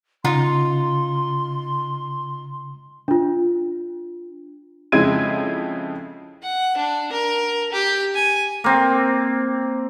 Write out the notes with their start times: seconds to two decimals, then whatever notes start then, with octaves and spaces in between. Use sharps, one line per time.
0.24 C#3 D#4 F4 A#5 C6
3.08 D4 F4
4.92 F2 C#3 G#3 E4 G#6 D#7
6.43 F#5
6.77 D4
7.12 A#4
7.72 G4
8.15 G#5
8.64 A#3 C4